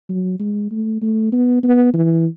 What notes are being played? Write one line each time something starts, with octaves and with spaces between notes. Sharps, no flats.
F#3
G#3
A3
A3
B3
B3
E3